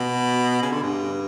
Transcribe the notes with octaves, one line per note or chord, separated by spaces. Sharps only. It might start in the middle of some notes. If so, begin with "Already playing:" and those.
Already playing: B2
C#3
D3
G2